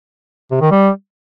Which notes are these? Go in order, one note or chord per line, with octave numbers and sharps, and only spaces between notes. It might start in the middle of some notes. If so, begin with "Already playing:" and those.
C3
D#3
G3